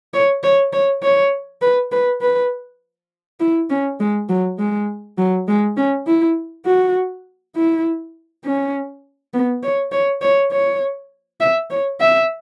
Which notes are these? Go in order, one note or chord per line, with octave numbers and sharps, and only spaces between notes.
C#5
C#5
C#5
C#5
B4
B4
B4
E4
C#4
G#3
F#3
G#3
F#3
G#3
C#4
E4
F#4
E4
C#4
B3
C#5
C#5
C#5
C#5
E5
C#5
E5